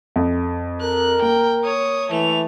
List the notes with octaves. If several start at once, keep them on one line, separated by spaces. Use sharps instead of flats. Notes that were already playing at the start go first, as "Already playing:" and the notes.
F2
A#4 F#6
A#3 G5
C#5 D#6
E3 A3 F7